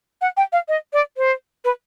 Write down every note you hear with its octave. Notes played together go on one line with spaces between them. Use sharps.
F#5
G5
F5
D#5
D5
C5
B4